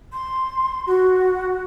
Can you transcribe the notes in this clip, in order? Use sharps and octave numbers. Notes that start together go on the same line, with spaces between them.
C6
F#4